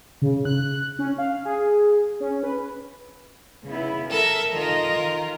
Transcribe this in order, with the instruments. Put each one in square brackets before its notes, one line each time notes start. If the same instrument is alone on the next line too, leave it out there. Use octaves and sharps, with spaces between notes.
[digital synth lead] C#3
F#6
C#4
F5
G#4
C#4
B4
[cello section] C#3 B3 E4
[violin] A4 E5 [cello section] A#4
[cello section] D#3 D#5 [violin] F4 A#4
[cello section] D#3